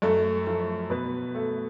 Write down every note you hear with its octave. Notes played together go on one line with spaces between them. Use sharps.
F#2 A3 A4
F3 A3
B2 B3 B4
A3